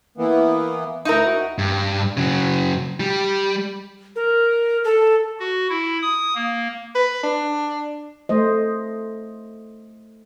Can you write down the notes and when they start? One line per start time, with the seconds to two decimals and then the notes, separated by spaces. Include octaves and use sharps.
0.17 E3 A#3 B3
1.05 D2 D#4 E4 A#4
1.25 F#4
1.58 G2
2.17 C#3 F#3
3.00 G3
4.16 A#4
4.84 A4
5.40 F#4
5.70 E4
6.02 D#6
6.35 A#3
6.95 B4
7.23 D4
8.29 A3 C5 D#5